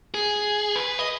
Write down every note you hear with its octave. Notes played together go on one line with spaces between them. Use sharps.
G#4
B4
D#5